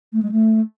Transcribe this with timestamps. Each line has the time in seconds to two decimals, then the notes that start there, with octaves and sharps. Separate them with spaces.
0.13 A3
0.22 G#3
0.31 A3